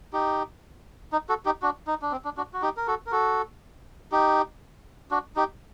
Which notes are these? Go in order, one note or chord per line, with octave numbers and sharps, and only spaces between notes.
D#4 G4
D#4
F#4 A4
D#4 G4
D4 F#4
D#4
D4
C4
D4
D4 F#4
F#4
D#4 G4
A#4
F#4 A4
A#4
F#4 A4
D#4 G4
D4 F#4
D#4 G4